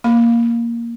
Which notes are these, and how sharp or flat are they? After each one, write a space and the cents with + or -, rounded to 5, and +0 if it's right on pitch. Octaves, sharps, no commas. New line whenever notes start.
A#3 +0 B5 +0